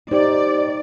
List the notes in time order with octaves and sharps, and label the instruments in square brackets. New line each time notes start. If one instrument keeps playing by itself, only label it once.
[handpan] D#4 [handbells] G4 C5 [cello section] D5